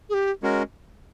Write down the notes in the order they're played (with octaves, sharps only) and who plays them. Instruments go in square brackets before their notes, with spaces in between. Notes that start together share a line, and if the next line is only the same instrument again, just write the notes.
[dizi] G#4
G4
[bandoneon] G#3 C#4 F#4 A#4